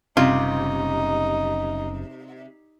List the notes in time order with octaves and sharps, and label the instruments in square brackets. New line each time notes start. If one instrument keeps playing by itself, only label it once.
[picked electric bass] F#1 G3 C#4 [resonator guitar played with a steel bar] C3 [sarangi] D#4 [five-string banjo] F4